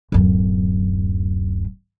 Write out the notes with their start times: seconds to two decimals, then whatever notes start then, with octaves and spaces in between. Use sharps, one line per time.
0.12 D1 F#2